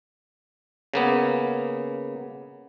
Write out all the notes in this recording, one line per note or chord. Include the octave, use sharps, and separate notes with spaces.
C#3 A#3 B3